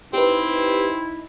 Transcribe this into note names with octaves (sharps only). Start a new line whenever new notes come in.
C4 D#4 E4 G4 B4